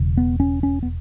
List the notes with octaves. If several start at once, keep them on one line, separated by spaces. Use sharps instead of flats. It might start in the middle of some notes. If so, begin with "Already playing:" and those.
Already playing: E1 E2 C#3
B3
C#4
C#4
B3